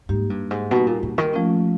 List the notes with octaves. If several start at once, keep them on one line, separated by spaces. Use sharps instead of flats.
G#2 G3 A#3 D#4 G4
G2
G#2
B2 G3 A#3 D#4 G4
A#2
A#2
D#3
F3 A3 C#4 F4